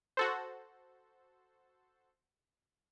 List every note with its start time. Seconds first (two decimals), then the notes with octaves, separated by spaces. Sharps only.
0.17 F#4 A4 C5